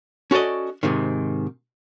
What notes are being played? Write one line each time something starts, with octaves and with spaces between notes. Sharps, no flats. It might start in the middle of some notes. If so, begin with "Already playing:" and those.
C#4 F#4 A4 D5 D#5
G#2 C3 D#3